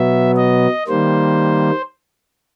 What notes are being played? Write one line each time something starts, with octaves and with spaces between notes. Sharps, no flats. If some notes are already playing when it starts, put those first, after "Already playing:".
Already playing: B2 F#3 B3 E5
D#5
D#3 G3 A#3 C5